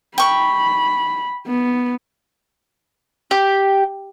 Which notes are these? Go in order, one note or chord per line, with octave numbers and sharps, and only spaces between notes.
G5 B5 C#6
B3
G4